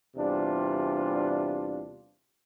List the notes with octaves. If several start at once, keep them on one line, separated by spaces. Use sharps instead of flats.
E2 C3 G3 D4 F4